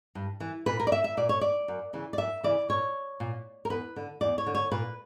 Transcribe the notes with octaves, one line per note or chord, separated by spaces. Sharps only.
G2
E3
A#2 B4
A#4
D5
E5
E5
A#2 D5
C#5
D5
F#2
C#3 E3
D5
F#2 E5
C#3 E3 D5
A#2 C#5
A#2
A#4
E2 B4
D3
E2 D5
C#5
D3
C#5
A#2 B4